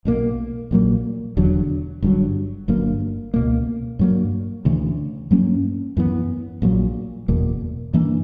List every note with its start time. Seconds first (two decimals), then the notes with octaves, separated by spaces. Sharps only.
0.05 B1 B2 A#3
0.71 A#1 A#2 F#3 A#3
1.37 E1 E2 D3 F#3
2.03 G1 G2 D3 F#3
2.68 G1 G2 F#3 A#3
3.34 C#2 B2 A#3
3.99 G2 F#3 A#3
4.65 D2 C#3 E3
5.31 G2 F#3 A#3 C#4
5.97 F#2 E3 B3
6.62 A#1 A#2 F#3
7.28 F#1 E2 B2 A#3
7.93 G2 E3 A#3 D4